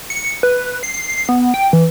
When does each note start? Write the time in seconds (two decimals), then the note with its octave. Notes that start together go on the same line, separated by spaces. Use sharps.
0.10 C#7
0.43 B4
0.83 C7
1.29 B3
1.54 G5
1.73 E3